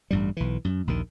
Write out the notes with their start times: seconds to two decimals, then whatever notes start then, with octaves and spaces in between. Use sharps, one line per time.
0.11 A1 G2 G3
0.37 B1 E3
0.65 F#2
0.87 A#1 D#2 D#3